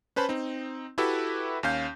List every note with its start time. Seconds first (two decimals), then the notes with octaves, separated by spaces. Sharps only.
0.16 C#4 B4 C5 A5 B5
0.29 C4 D#4
0.98 E4 F#4 G4 A4 B4 E5
1.63 D#2 C#4 F5 G6